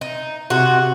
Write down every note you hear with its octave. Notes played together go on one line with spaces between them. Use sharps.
D#4
C3 F#4